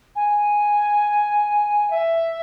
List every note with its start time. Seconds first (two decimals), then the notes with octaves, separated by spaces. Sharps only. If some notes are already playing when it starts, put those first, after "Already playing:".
0.15 G#5
1.90 E5